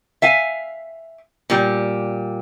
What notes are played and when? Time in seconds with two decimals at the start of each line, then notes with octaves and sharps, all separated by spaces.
0.22 E5 F5 G#5
1.50 A#2 G3